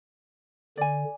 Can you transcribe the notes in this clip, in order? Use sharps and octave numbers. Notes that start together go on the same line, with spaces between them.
D3 D5 G#5